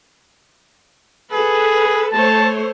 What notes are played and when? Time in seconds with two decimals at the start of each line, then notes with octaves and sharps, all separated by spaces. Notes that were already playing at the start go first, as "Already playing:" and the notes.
1.33 G#4 A4 B4
2.13 A3 C5 C#5 A5